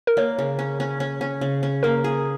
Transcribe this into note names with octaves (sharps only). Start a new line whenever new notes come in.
A#4
A#3 C#5
C#3
C#4
C#4
C#4
C#4
C#3
C#4
A#3 A#4
G#4